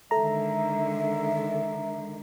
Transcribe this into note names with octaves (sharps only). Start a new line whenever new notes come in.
D3 D#3 G#3 A4 E5 A#5